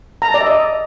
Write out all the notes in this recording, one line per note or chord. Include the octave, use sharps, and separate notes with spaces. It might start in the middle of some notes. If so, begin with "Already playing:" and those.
A#5
A5
D5
E5
D#5